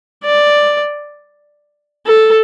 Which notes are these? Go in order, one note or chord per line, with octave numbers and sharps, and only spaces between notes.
D5
A4